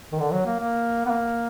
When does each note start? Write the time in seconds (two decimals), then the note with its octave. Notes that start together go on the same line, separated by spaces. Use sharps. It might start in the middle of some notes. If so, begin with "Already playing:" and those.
0.12 D#3
0.20 D3
0.33 F#3
0.46 A#3
0.59 A#3
1.06 B3
1.11 A#3